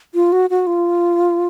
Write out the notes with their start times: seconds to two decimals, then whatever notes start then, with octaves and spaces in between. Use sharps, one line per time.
0.15 F4
0.32 F#4
0.50 F#4
0.67 F4